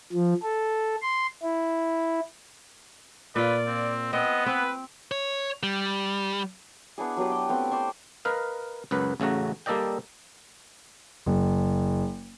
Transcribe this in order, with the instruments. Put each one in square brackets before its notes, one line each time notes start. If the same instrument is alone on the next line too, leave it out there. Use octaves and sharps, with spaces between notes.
[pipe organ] F3
A4
C6
E4
[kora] A#2 F4 [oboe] B4 [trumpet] D5
[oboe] C4
[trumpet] B3 [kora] C4 [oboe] D#5
[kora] C4 [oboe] B4
[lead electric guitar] C#5
G3
[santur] B3 D4 E4 G#4
F#3 B3 G4 B4
G5
A3 B3 C4
C5 D5 C6 C#6
[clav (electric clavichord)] A#4 B4 D#5 F5
C#2 F#2 F#3 B4
A1 C#3 A3 F#4 A#5
G3 A#3 A4 D5 D#5 G5
[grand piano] F#1